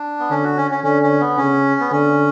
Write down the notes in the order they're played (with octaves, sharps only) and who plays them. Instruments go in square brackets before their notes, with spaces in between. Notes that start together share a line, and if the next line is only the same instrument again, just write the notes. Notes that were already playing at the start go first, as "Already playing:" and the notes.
Already playing: [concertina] D4
B3
[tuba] D3 [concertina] C#4
[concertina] F#4
C#4
C#4
[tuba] D3 [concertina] C#4
[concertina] C#4
B3
[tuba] C#3 [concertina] C#4
[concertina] B3
[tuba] D3 [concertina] C#4